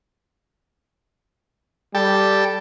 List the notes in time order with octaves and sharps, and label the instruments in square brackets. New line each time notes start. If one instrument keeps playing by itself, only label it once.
[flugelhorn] G3 [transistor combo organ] G4 A4